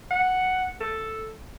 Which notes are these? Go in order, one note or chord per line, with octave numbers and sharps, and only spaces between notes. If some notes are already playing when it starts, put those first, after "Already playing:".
F#5
A4